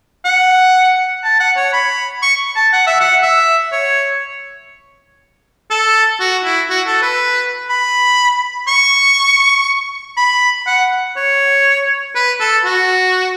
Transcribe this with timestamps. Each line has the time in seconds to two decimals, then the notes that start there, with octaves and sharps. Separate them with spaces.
0.25 F#5
1.24 A5
1.40 F#5
1.57 C#5
1.73 B5
2.22 C#6
2.56 A5
2.73 F#5
2.87 E5
3.00 F#5
3.22 E5
3.72 C#5
5.71 A4
6.20 F#4
6.44 E4
6.70 F#4
6.87 A4
7.02 B4
7.69 B5
8.68 C#6
10.17 B5
10.67 F#5
11.17 C#5
12.15 B4
12.40 A4
12.65 F#4